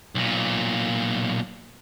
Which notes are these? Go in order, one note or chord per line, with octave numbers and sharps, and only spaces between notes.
B1 A#2